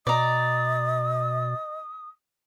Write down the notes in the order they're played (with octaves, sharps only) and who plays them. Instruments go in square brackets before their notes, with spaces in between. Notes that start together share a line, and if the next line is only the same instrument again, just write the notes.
[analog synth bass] B2 [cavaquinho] D5 A#5 [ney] D#5 [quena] D#6